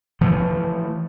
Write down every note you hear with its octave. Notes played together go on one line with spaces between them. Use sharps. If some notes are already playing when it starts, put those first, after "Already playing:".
E3 F3 A3